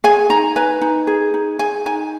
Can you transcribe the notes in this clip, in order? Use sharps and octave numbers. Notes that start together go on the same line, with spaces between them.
G#4 G#5
D#4 A#5
B4 G#5
D#4
G#4
D#4
G#4 G#5
D#4 G#5